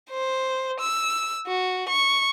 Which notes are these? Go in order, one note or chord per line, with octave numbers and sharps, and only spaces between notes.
C5
E6
F#4
C#6